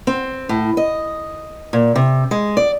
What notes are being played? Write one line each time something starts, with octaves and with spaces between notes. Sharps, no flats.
C4
A2
D#5
A#2
C3
G#3
D5